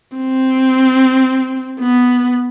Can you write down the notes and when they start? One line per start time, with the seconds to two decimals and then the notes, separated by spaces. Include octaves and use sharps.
0.17 C4
1.79 B3